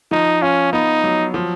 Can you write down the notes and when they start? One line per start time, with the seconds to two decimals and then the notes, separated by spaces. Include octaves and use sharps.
0.11 F3 D#4
0.42 C#4 F4
0.73 B3 D#4
1.04 F#3
1.34 F3